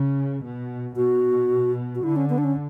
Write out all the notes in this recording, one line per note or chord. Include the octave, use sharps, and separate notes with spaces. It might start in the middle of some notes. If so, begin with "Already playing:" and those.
Already playing: C#3
B2
B2 F#4
F#4
D3 E4
C#4
B3
D4
C#4